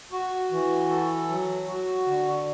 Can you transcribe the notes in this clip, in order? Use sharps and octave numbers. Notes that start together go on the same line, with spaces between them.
F#4
E3
A4
F#3
F#4
D3